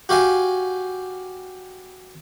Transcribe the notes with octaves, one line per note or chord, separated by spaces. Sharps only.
F#4 G4 F5 G#5